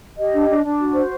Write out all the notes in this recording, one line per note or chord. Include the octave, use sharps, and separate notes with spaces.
G4 D#5
D4
D4
D4
F#4
C5